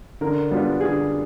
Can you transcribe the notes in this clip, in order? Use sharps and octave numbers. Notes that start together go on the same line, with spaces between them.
D3 A#4
G3 B3 D4 F4
D3 G#4